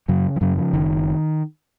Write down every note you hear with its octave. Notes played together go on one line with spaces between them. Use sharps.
F#2 C#3 F#3
F3
F#2 C#3 F#3
F3
F#1 D#3